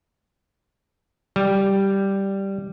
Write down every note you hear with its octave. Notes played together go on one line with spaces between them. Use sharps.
G3